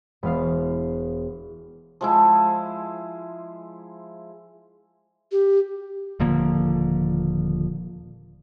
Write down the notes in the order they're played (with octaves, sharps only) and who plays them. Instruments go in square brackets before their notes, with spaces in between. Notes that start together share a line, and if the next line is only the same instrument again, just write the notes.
[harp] E1 B3 F5 C7
[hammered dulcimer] F3 G#3 E4
[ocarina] G4
[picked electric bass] D#1 D3 F3 A#3